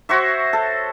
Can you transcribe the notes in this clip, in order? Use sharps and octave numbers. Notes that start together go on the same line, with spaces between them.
F#4 C5 C#5 E5
A4